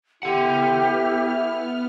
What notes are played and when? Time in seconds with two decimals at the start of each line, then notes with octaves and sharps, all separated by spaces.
0.23 B3 E4 G4 A4 F#5 F6